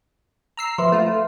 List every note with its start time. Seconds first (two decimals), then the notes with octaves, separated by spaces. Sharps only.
0.57 A#5 E6 C7
0.78 F3 B4 E5 C6
0.92 A3 F4